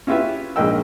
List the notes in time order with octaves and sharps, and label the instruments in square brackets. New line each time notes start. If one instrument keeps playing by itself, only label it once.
[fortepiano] C#4 E4 F4 G4 B4 E5
A#1 G#3 A#3 D#4 G5 E6